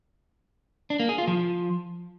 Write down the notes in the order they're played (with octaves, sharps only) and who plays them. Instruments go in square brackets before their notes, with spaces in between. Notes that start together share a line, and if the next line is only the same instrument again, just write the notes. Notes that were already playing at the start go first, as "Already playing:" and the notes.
[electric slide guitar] D4
A#3
G#4
F4
F3